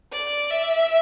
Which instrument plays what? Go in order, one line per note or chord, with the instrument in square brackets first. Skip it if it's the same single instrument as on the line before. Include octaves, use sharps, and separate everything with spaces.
[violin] D5
E5